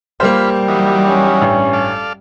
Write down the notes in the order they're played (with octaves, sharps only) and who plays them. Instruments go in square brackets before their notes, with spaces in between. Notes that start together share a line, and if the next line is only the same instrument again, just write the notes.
[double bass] G3 [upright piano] A#3 A#4 C5 [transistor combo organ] F4 B5
[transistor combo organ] E3 F#3 D#4
[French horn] C#4
[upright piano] A1 G2
[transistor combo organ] A4 D5 F5